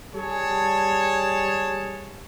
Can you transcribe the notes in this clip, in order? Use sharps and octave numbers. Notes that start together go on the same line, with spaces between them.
G3 G#4 C#5 A5